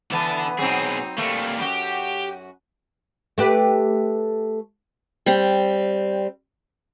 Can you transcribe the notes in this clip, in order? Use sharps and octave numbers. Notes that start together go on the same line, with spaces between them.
D3 E3 B3 A5
B2 F#3 C4 D#4 G#4
G3 A3 A#3
F#2 F#4 G4
A3 G4 B4
G3 C4